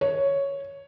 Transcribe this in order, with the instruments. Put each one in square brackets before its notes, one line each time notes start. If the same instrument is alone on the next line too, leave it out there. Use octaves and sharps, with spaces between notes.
[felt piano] C#5